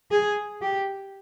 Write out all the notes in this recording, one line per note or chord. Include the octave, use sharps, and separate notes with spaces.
G#4
G4